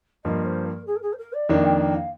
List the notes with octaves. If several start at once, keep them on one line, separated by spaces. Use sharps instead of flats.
G2 F3 A#3 D#5
C5
A#4
G#4
A#4
G#4
C5
A#4
D5
F2 D#3 A#3 D4 D#5
G5
G5
F5